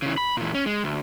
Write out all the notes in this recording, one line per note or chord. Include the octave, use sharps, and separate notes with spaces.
C#3 E3
B5
A#2 E3
C#4
G#3
D2